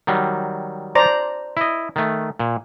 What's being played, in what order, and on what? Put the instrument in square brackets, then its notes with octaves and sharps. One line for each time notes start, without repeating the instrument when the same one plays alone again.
[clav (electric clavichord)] D#3 F#3 G3
[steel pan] C5 D5 A#5
[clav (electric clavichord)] E4 D#5
D#3 A3
A#2